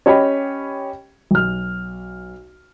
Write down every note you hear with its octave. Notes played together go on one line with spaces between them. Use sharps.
C#4 G4 C#5 D#5 G5 B5
B1 F6